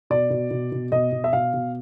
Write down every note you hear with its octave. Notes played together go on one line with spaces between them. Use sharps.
B2 D5
B2
B2
B2
B2 D#5
B2
E5
B2 F5
B2